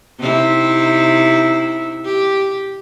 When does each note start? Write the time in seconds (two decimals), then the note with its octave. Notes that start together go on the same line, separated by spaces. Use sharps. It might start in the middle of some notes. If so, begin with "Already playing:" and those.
0.19 C3 D#4 E4
2.05 G4